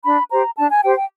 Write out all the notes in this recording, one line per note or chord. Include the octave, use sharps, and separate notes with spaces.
D4 B5
G4 C5 A#5
D4 A5
G#5
G4 C5 G5
G5